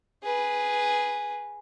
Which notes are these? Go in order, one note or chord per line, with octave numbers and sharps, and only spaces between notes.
G#4 B4